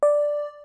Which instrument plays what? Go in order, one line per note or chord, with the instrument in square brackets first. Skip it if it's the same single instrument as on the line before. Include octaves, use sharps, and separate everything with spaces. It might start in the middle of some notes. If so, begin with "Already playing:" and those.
[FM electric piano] D5